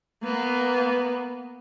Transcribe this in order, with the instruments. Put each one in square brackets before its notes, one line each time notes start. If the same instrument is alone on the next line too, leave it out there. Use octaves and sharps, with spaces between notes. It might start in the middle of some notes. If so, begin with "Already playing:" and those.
[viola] A#3 B3